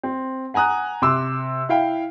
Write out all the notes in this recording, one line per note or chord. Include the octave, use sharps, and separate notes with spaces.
C4
F#5 G#5 A#5 D#6 F#6
C3 C6 D6 E6
E4 F5 G5